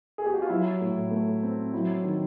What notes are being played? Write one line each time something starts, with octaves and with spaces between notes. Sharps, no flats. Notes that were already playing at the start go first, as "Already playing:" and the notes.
G#4
G4
F#4
F4
F#3 E4
A2
A3
C4
F#3 E4
D#3